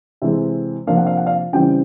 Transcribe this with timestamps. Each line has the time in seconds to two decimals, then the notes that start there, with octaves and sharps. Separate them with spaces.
0.22 C3 E3 G#3 C4 E5
0.87 C3 F3 A#3 D4 F5
0.97 F#5
1.06 F5
1.17 F#5
1.26 F5
1.53 C#3 E3 G3 C4 G5